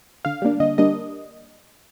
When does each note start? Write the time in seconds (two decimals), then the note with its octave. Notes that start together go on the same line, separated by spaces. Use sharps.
0.25 D3 F5
0.42 G3 A#3 D4
0.60 D3 D#5
0.78 G3 A#3 D4 D#5